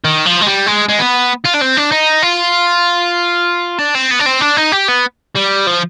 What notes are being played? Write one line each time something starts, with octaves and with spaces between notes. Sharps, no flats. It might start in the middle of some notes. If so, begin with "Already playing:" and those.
D#3
F3
G#3
G3
G#3
G#3
B3
F4
D4
C4
D4
D#4
F4
D4
C4
B3
D4
C4
D4
D#4
G4
B3
G3
F3